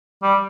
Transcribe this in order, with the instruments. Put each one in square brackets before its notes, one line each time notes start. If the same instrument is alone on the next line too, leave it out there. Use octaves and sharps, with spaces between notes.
[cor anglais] G3